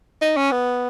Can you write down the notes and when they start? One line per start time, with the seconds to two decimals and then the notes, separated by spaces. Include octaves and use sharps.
0.21 D#4
0.37 C#4
0.52 B3